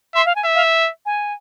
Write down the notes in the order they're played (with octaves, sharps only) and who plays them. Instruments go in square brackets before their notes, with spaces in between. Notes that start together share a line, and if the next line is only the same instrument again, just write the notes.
[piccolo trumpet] E5 [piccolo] C6
[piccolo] F5
G#5
[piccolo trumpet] E5
[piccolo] F5
G#5